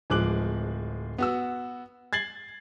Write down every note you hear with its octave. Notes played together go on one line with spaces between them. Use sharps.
D1 F3 G#3 D6 F#6 F#7
B3 F#4 E6
G#6 A6 C7 F#7